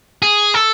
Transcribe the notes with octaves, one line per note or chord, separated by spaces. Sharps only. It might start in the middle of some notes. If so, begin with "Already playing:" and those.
G#4
A4